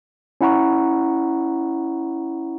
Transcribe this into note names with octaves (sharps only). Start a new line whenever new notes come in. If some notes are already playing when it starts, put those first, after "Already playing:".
C#4 E4 F#5 A#5 C#6